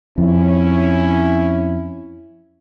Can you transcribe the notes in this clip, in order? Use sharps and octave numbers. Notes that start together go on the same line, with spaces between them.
F2 C#4 E4